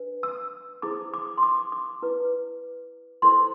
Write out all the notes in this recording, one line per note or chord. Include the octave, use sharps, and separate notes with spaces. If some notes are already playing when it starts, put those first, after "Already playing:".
Already playing: D4 B4
E6
E4 G#4 C5 D6
D6
C6
D6
D6
E4 B4
E4 A4 C5 C6